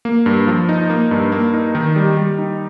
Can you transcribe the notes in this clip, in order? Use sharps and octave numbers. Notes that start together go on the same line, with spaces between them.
A#3
G2
F3
D#4
A#3
G2
A#3
D#4
D#3
G3
G3
D#4